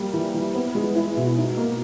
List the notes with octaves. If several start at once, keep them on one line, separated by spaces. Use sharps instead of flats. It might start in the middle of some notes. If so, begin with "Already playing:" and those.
Already playing: G3 A#3
E3
E3
B3
G#3
E4
B2
D#4
A#3